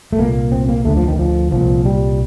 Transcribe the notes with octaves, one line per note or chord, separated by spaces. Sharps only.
A3
C2 A#2 A#3
C4
A#3
D2 D3 A3
F3
D#3
F3
C2 A#2 F3
G3